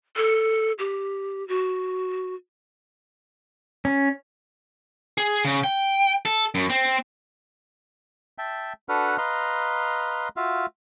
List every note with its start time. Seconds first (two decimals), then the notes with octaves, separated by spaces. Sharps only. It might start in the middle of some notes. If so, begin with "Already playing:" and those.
0.17 A4
0.79 G4
1.48 F#4
3.85 C#4
5.18 G#4
5.45 C#3
5.64 G5
6.25 A4
6.55 F#2
6.70 C4
8.38 E5 G5 A5
8.89 D4 F#4 A4 B4 F#5 F6
9.18 B4 D#5 F5 A#5 C6
10.36 F4 F#4 E5 F5